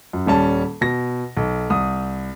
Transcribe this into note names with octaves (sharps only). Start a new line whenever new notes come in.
F#2
D#1 G3 C#4 A5
B2 A#6
B1
C2 D#6